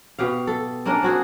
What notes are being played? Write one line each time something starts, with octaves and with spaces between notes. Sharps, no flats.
B2 G4 F5
A4
A#3 C#4 D4 A#4
C4 F#4 G#4